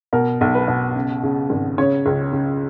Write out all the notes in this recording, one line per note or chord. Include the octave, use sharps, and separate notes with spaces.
B2 A#4
B1
B4
B2
C#3
C#3
G#1
C#3 C#5
C#2
C#3